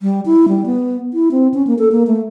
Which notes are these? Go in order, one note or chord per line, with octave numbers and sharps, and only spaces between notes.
G3
E4
G3
B3
E4
C4
C#4
A#3
A4
A#3
A3